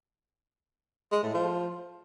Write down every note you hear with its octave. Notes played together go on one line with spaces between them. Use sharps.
G#3
A2
F3